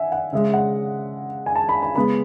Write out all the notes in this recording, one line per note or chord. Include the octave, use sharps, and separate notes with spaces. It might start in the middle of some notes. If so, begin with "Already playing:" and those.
Already playing: E5 F#5 G#5
F#5
C#3 G#3 C#4 E5
F#5
G#5
A5
B5
B5
C#3 G#3 B3 B5